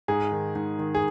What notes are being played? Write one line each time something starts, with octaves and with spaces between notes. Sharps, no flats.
G#2 G#4
D#3
G#2
D#3
G#4